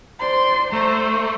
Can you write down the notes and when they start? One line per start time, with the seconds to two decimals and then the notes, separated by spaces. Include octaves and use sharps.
0.20 C5 D5 C6
0.73 A3 C5 A#5